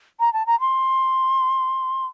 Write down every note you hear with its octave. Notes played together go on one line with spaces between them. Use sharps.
A#5
A5
A#5
C6